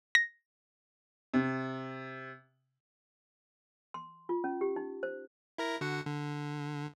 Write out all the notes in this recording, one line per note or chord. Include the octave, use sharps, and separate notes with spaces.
A#6
C3
C6
F4
C#4
G4
D#4
C5
E4 A#4 A#6
D3 F#4 F#5
D3